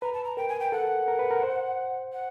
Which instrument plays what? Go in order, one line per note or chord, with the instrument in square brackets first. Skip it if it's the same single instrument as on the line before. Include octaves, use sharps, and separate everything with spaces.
[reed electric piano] B4 [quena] A#5
[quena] A5
A#5
[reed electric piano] A#4 [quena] G5
[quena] G#5
G5
[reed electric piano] A4 [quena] F#5
[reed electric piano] A#4
B4
A#4
C5
[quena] F#5